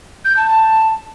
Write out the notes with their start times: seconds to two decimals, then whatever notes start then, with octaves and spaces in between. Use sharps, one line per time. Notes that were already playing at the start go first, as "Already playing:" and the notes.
0.24 G6
0.36 A5
0.48 A5